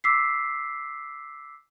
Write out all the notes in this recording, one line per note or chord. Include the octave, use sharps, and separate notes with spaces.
D6 E6 B6 C7